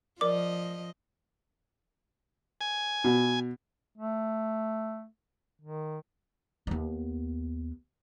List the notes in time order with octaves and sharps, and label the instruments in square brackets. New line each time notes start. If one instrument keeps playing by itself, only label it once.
[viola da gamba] F3 D#5 [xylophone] A#4 D5 D6
[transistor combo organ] G#5
[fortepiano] B2
[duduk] A3
D#3
[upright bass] D#2 B3